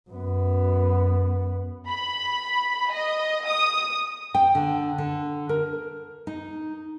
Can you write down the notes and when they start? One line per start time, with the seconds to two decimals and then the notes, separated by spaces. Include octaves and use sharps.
0.10 F#2 B3
1.88 B5
2.91 D#5
3.47 D#6
4.34 G5
4.55 D3
4.98 D3
5.49 A#4
6.27 D#4